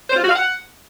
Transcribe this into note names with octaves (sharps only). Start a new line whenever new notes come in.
C5
F4
F#4
F5
F#5